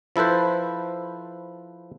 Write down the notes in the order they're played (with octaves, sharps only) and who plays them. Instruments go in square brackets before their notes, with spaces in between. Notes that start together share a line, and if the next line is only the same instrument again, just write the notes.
[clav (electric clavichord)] F3 E4 A4 B4 C5